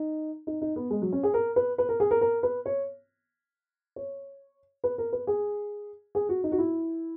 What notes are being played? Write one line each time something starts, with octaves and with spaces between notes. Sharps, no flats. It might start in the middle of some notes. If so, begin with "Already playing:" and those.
Already playing: D#4
D#4
D#4
B3
G#3
F#3
C#4
G#4
A#4
B4
B4
A#4
G#4
A#4
A#4
B4
C#5
C#5
B4
A#4
B4
G#4
G#4
F#4
D#4
F#4
E4